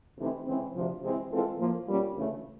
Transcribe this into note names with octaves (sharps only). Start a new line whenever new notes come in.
C3 E3 A3 C4 D#4
C#3 E3 G#3 C4
D2 C3 F3
C3 E3 G#3 C4 E4
E3 G#3 C4 F4 A4
A2 F3 A#3
B2 G3 A#3 C#4 F4
D2 C#3 E3 A3 C#4